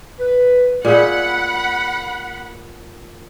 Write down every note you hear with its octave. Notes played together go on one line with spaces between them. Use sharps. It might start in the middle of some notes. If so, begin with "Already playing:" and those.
B4
A#2 G#4 D#5 F#5 B5